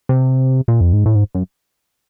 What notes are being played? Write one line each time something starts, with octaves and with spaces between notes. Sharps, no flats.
C3
A#2
F2
G#2
A2
G#2
F#2